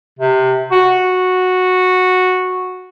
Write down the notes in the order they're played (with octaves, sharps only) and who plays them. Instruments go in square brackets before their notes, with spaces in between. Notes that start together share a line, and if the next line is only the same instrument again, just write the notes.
[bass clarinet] C3
F#4